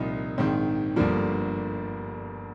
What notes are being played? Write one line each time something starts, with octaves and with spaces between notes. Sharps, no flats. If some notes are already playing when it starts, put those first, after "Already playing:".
Already playing: C2 A#2 F3 D#4
A#1 G#2 D#3 C4
G1 G2 D3 F3 A#3